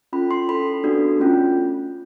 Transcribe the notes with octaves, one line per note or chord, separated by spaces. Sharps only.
C#4 F4 A4 B5
C6
C#4 E4 A4 B5
B3 D4 F#4 A4
A3 C#4 F4